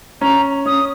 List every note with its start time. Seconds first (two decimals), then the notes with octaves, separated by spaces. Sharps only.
0.21 C#4 A#5
0.66 C#4 D#6